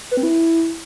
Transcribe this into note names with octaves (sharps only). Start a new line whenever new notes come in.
B4
C4
E4